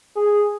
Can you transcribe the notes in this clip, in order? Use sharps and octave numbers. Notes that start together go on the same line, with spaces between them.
G#4